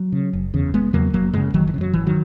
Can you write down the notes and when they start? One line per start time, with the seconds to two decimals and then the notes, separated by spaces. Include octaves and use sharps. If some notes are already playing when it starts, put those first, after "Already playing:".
Already playing: F#3
0.12 C#3
0.33 F#1
0.54 E2 C#3
0.74 F#1 G#3 B3
0.93 E2 C#3 F#3 A#3
1.13 F#1 F#3 A#3
1.33 F#2 C#3 E3 G#3
1.54 F#1 D#3 F#3
1.67 E3
1.74 C#3
1.78 F#2 F#3
1.93 G#1 E3
2.07 D#3 F#3